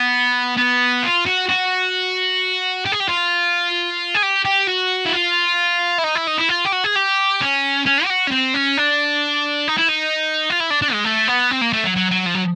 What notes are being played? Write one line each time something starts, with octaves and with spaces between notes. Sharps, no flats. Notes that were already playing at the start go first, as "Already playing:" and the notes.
Already playing: B3
B3
F4
F#4
F#4
G4
G#4
G4
F4
G#4
G4
G4
F#4
E4
F4
E4
D#4
E4
D#4
E4
F4
G4
F#4
G#4
G4
C#4
C#4
G4
F#4
C#4
C4
C#4
D4
D#4
E4
D#4
F4
E4
D4
D4
G#3
A3
B3
C4
A#3
A3
F#3
F#3
F#3
F3
F#3